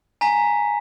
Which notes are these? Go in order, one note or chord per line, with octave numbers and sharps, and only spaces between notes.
G#5 A#5 B6